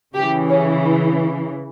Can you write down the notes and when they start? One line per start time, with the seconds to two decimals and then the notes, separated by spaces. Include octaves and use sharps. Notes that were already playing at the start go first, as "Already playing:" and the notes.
0.14 C#3 E3 G4
0.49 C#4